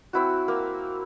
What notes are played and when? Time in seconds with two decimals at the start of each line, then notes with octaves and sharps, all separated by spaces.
0.13 C4 E4 F#4
0.48 A#3